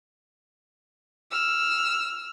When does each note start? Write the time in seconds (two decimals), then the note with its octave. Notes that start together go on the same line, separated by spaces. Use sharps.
1.31 E6 F6